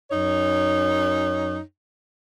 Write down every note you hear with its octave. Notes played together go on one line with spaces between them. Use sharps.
F#2 D#4 C#5